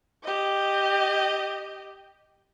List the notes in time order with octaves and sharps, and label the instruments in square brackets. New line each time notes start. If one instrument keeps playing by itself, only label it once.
[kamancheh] G4 D#5